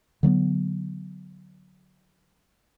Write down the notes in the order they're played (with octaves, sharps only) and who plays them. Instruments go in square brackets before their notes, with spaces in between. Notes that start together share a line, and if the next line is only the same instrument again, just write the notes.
[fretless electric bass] D3 F#3 A3 B3